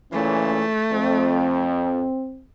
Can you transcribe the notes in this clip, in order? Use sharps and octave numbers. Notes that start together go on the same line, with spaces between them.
C#2 A#2 E3 A3 C#4
F2 C4